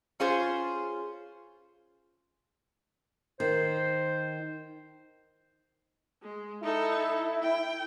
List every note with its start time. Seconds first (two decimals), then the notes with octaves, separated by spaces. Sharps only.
0.20 C#4 F4 G#4 C5
3.40 D#3 C5
6.23 G#3
6.63 D#4 E4 A4
7.42 G5